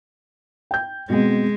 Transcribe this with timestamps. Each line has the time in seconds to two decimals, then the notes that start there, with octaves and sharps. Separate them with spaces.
0.71 G5 G6
1.10 B2 G#3 C4